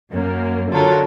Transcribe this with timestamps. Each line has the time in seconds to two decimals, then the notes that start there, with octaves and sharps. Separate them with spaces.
0.12 F#2 A#3
0.70 D3 F#3 F4 A4 A#4